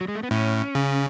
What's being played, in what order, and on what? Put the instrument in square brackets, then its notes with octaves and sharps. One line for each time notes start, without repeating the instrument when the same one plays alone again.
[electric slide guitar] F#3
G#3
A3
B3
[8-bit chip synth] A2 [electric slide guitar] C#4
[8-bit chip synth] C#3